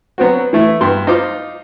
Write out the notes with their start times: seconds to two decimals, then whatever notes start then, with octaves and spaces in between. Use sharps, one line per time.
0.18 F#3 B3 C4 F#4
0.53 E3 A3 E4
0.81 G2 B3 C6
1.07 D#4 F4 C5 D6